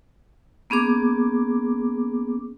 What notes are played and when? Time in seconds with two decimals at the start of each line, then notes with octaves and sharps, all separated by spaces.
0.70 A#3 B3 C#4 G#4 D6